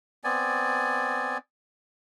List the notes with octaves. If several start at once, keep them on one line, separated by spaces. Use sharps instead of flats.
B3 C4 D5 G#5